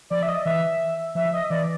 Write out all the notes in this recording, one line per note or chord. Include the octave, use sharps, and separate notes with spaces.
F3 D5
E5
D#5
E3 E5
F3 E5
D#5
E3 D5